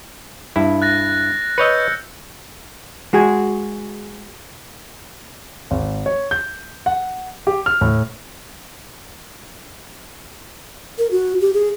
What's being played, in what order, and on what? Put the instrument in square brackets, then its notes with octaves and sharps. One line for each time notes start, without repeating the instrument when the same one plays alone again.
[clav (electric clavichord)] G2 E4
[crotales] F#6 A6 A#6
[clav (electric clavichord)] B4 C#5 D#5 [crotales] E6 G6 C#7
[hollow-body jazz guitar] G#3 F#4 G#4
[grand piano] G#1
C#5
G6
F#5
G4
F6
A2
[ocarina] A#4
F#4
G4
G#4